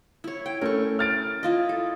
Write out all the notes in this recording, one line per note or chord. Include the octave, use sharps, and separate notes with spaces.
E4 C#5
G5
A3 C#4 A#4 C#6
F6 A6 D7
E4 F4 D#5
A4